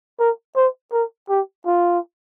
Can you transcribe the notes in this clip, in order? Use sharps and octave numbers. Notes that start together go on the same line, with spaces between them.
A#4
C5
A#4
G4
F4